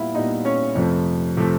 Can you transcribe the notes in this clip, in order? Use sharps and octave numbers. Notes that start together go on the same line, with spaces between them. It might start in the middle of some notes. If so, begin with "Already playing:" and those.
Already playing: A#2 G3 B3 E4 F4 E5 F5
A#2 G3 B3 D#4 D#5
C#4 C#5
F2 C3 F3 A3
C3 F3 A3